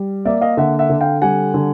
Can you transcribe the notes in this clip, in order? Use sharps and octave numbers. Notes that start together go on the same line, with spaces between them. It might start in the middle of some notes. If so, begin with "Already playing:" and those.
Already playing: G3
A#3 D5 E5
D#5 F5
D3 E5 F#5
E5 F#5
D3
F5 G5
G3 F#5 G#5
D3